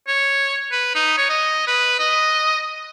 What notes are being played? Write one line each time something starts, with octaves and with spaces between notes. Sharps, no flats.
C#5
B4
D#4
C#5
D#5
B4
D#5